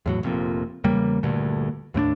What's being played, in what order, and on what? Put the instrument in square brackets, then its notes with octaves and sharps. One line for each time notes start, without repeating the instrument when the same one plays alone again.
[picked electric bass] E2 A2 F#3
F1 F2 A#2
E2 C#3 G3 A#3
D2 G2 A#2 D3
D#2 A2 C4 D4